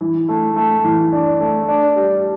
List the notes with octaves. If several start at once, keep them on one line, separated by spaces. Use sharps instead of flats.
E3
A3
A3
E3
D4
A3
D4
G3